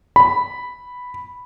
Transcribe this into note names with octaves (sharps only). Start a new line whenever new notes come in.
B5